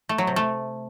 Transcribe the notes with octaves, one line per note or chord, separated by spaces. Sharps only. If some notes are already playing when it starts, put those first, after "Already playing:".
A3
F#3
C3
A3